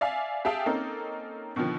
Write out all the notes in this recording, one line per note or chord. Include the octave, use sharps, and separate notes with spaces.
D5 E5 F5 G#5
G4 G#4 E5 F5 G5 A5
A#3 C4 C#4 D#4 A4
B2 D3 D#3 F3